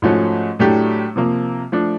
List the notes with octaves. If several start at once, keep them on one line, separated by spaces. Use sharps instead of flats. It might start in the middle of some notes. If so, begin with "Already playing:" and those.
G#2 F3 A3 C#4 F#4
A2 F#3 A3 D4 G4
C3 F3 A#3
F3 A3 D4